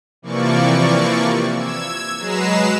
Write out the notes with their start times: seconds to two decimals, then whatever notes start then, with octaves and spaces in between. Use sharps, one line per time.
0.22 C3 E3 F3 A#3 D5 C#6
1.54 E6 G#6
2.18 F#3 G#3 B4 A#5 C7 E7